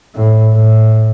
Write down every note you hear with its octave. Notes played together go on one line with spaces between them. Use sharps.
A2
A2